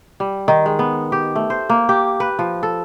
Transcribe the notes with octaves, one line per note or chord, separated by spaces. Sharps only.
G3
D#3
G#3
B3
G4
A3
C5
A#3
G4
B4
F3
A4